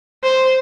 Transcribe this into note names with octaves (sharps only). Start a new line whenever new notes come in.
C5